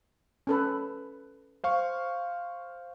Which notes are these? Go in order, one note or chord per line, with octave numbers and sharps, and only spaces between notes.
C#4 A4 B4
C5 F5 C#6